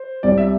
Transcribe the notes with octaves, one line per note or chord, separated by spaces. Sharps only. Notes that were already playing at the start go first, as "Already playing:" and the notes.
Already playing: C5
C2 C3 G3 D5
E5